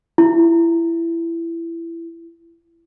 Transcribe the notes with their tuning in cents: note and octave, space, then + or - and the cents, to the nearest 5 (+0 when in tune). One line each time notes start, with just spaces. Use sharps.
E4 +20